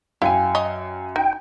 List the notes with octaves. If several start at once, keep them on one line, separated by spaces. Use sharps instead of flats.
F#2 E4 F5 G5 G#5
C#5 D#5
D#4 G5